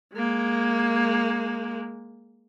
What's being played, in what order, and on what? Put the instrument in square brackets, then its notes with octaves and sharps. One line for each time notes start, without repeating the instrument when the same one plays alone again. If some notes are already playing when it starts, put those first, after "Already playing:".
[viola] G#3 A#3